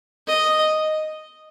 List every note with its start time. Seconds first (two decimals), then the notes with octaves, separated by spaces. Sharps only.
0.28 D#5